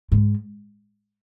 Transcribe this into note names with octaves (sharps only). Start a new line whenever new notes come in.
G#2